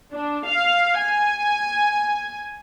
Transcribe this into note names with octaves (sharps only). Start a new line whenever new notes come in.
D4
F5
G#5